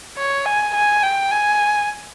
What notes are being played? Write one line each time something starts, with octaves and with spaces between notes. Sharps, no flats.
C#5
G#5
G#5
G5
G#5